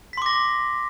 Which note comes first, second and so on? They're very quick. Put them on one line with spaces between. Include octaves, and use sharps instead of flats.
B6 C6 D6 A#6